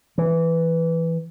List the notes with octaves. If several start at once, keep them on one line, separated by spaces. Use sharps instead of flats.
E3